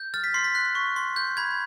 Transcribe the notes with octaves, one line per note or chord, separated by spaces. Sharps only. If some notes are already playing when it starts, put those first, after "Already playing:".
Already playing: G6
F6 A6
B6
C6 C7
B6
F#6
C#6
C6
G6
B5 G#6